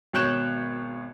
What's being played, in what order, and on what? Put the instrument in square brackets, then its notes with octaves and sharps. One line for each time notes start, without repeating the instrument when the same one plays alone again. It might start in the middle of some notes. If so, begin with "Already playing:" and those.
[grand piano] G#1 B2 C#5 F#6 G6 E7